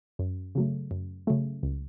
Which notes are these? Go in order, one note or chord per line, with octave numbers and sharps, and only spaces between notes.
F#2
C#3 F#3 A3
F#2
C#3 F#3 A3
C#2